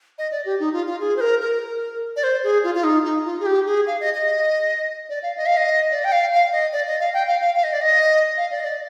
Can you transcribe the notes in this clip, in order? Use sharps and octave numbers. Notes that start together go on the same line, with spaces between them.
D#5
D5
G4
D#4
F4
F4
G#4
C5
A#4
A#4
D5
C5
G#4
F4
F4
D#4
D#4
F4
G#4
G4
G#4
F5
D#5
D#5
D5
F5
D#5
F5
D#5
D5
G5
F5
F5
D#5
D5
D#5
F5
G5
F5
F5
F5
D#5
D5
D#5
F5
D5
D#5
D5